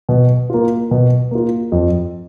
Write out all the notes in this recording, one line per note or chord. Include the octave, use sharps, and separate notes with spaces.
B2
A#3 F4
B2
A#3 F4
F2